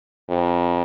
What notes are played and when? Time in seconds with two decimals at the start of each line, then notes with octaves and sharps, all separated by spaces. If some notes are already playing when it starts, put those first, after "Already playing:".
0.29 F2